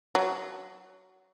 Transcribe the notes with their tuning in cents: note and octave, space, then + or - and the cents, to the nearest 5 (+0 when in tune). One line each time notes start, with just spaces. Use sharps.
F#3 +20